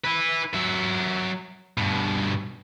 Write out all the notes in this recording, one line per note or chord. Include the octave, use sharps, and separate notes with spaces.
E4 B4
F#3 E5
G2 B2